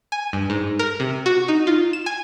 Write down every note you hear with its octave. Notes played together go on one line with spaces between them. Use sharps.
G#5
G2
G#2
A#4
C3
F#4
D#4
F4
E7
G#5